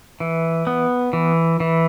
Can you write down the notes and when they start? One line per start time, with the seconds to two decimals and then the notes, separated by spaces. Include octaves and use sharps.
0.20 E3
0.67 B3
1.13 E3
1.60 E3